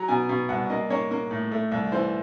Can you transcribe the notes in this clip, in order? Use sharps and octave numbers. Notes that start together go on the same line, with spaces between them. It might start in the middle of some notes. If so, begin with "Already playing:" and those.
Already playing: F#3 A#5
B2 G#5
B2
C2 F#5
A#3 D#5
A#3 C#5
A#3
A2
A3
C2
E3 C5